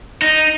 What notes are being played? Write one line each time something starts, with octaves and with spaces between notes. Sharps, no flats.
D#4